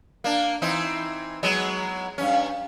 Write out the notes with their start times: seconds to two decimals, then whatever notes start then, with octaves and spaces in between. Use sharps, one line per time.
0.24 A#3 D4
0.62 E3 C4 D#4
1.43 F#3 G#3 B3
2.18 G2 C#4